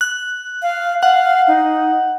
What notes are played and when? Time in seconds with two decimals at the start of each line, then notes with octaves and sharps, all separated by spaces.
0.01 F#6
0.63 F5
1.03 F5 F#5
1.48 D#4